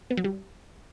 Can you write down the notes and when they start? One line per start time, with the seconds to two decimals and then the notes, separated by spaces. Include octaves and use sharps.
0.10 B3
0.17 F#3
0.24 G3